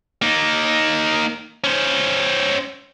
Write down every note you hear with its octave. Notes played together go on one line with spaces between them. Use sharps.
A#3 D#4
C#4 C5